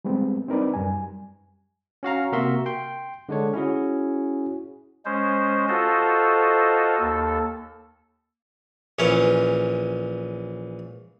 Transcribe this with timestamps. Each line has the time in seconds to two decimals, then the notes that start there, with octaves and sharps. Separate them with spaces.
0.05 G3 G#3 B3 C4
0.49 C4 D#4 A#4 B4 D5
0.74 F#2 G3 G#5
2.03 C#4 F#4 F5 A#5
2.32 C3 A#3 F#4 A#4 E5 C6
2.66 G5 C6
3.29 D3 G#3 D4 C#5
3.54 C#4 E4 F#4 G#4
5.05 G#3 C#4 C5
5.68 F4 F#4 A4 C5 D#5
7.00 D#2 A4
8.99 A#1 E3 C#4 C#5